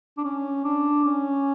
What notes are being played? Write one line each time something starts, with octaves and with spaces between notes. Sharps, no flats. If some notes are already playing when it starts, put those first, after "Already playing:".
D4
C#4
D4
C#4